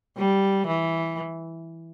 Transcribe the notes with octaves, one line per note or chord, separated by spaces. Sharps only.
G3
E3